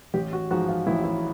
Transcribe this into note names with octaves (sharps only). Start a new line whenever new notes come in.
A1 G4
F#4
G#2 F3 G#3 F#4
F4
A1 E4
E4